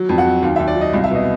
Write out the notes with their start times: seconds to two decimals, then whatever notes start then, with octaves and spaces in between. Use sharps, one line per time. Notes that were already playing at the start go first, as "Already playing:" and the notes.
Already playing: F#3
0.09 F2
0.18 F#5
0.25 F#3
0.43 D#2 F5
0.56 E5
0.60 D#2
0.67 D5
0.76 F#3
0.81 D#5
0.93 C2 F5
1.04 E5
1.11 B2 D#5